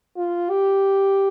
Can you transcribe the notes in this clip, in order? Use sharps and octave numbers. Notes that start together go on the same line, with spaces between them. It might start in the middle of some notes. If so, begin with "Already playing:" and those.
F4
G4